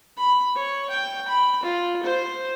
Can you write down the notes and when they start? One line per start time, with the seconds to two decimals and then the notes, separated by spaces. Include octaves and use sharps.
0.17 B5
0.56 C#5
0.90 G5
1.29 B5
1.63 F4
2.03 C5